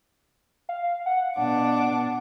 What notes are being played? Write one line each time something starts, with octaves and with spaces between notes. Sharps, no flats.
F5
F#5
B2 D4 D6